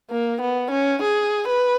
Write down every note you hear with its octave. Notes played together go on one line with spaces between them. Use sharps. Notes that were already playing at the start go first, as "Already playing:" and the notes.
A#3
B3
C#4
G#4
B4